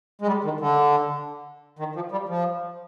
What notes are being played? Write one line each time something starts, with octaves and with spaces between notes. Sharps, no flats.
G#3
G3
D#3
D3
D#3
F3
G3
F3